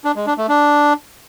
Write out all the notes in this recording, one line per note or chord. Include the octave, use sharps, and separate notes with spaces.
D4
G#3
D4
A3
D4